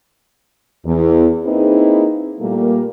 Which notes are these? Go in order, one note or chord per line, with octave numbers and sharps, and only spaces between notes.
E2
A#3 C4 D#4 E4 G#4 B4
A#2 G3 A3 A#3